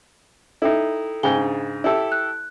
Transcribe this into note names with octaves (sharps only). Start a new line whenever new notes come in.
D#4 E4 A4 G5
G#2 C#3 G5 G#5 G7
D4
E4 G4 A4
F#6